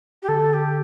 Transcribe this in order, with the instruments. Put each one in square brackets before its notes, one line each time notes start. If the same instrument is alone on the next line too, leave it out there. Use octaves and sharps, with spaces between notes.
[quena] G4
[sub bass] D3 [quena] A4
[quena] G4